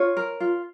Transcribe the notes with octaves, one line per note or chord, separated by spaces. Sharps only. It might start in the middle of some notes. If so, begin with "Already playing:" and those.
Already playing: F4 C#5
A#4
F4